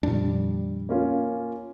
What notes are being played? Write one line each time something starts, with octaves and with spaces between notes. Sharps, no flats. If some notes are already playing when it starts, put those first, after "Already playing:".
F2 A#2 D#3 G3 D4
A#3 C#4 F4